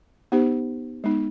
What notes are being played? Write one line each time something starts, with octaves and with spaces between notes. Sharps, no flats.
B3 D#4 G4 C5
G#3 B3 D#4